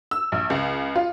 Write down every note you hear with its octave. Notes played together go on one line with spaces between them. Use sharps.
E6
A#1
C#2
F4